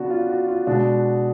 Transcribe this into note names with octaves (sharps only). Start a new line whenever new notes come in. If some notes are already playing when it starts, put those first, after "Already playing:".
Already playing: C#3 F#3 B3 D4 F#4
F4
F#4
F4
B2 G#3 D4 F#4